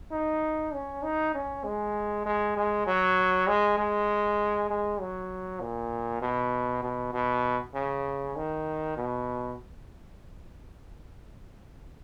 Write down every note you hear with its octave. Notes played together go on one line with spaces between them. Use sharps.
D#4
C#4
D#4
C#4
G#3
G#3
G#3
F#3
G#3
G#3
G#3
F#3
A#2
B2
B2
B2
C#3
D#3
B2